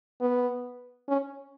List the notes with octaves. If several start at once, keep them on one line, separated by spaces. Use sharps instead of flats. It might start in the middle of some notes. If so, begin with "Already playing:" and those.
B3
C#4